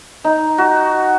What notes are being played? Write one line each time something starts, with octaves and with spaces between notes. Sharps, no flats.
D#4
F#4